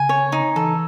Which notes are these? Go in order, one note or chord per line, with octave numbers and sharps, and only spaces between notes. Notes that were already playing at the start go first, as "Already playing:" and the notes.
Already playing: C#3 G#5
C#5
D#4
E3 A4